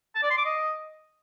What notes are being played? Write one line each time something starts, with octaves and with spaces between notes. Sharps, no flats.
A5
D5
C6
D6
D#5